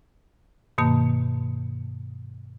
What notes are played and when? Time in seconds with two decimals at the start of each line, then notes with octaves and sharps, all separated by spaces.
0.78 G2 B2 D#3 A#3 A5